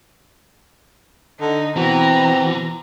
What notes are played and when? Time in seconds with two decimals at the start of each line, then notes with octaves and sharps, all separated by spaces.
1.40 D3 D#4
1.76 B2 E3 C4 A#5